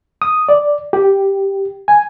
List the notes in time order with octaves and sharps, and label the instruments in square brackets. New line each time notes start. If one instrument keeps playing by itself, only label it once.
[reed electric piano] D#6
D5
G4
G#5